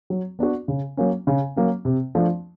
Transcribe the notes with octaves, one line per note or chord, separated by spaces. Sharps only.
F#3
B3 D4 F#4
C#3
F#3 A#3 C#4
C#3
F#3 A#3 C#4
C3
F3 A3 D4